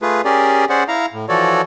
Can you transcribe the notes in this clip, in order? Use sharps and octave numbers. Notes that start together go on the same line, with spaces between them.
A3 F4 G#4 B4
C#4 G4 G#4 A#4 D5
C#4 G#4 C5 D5 F#5
E4 F5 A#5
A2
E3 F3 F#4 A4 C#5 D5